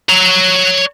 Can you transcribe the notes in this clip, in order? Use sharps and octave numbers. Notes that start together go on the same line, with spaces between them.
C#5 A#5